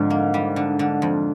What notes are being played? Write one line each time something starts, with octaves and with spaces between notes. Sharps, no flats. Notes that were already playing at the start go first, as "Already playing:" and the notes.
Already playing: F2 G#2 D3
A#3
G3
D3
D3
F2